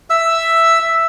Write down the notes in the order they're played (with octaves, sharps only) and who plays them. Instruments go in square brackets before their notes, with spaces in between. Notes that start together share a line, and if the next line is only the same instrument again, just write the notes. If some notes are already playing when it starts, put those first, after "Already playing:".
[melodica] E5 E6